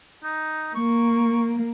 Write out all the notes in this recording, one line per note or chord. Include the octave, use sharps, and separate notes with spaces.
D#4
A#3 C#6